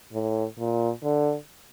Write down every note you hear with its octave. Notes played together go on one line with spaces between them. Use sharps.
A2
A#2
D3